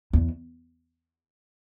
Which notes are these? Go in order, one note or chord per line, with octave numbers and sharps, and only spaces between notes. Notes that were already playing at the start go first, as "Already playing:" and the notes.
E2